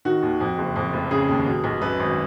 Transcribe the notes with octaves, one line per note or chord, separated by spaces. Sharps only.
D#3 F#4
D#2
F2
F#1
F2
F1
C#3 G#4
D#2
B2
B1
F#2 B4
G#1